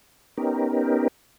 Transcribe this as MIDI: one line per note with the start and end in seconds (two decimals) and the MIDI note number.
0.37 1.08 59
0.37 1.08 61
0.37 1.08 63
0.37 1.08 67
0.37 1.08 70